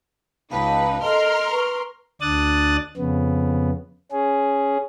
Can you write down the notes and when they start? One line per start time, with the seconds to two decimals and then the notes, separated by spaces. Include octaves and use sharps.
0.51 C#2 D#4 B4 F5 G5 A5
1.01 A4 A#4 D#5 C6 F6
1.51 B4 C#6
2.21 D2 D4 D5 D#6 F#6 A6
2.97 F2 C#3 B3
4.12 C#4 G#4